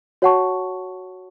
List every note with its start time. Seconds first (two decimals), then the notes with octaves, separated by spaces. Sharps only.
0.22 F#4 C#5 F#5 A5 C#6